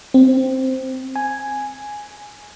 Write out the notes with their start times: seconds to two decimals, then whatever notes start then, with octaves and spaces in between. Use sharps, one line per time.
0.14 C4
1.16 G#5